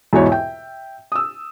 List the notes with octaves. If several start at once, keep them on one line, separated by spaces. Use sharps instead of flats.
E2 G#2 B2 E4 F#4 C#5
E5 G5
D#6 E6